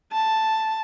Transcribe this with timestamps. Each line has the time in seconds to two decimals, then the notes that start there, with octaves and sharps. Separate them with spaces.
0.13 A5